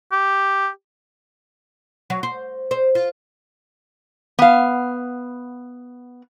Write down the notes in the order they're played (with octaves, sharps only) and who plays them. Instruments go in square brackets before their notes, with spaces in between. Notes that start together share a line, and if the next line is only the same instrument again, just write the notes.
[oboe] G4
[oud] F#3
C5
C5
F4
[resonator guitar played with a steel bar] B3 F5